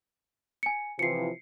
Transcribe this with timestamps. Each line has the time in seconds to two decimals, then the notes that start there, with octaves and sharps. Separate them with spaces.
0.63 G#5 C#7
0.99 C3 E3 F3 C7 C#7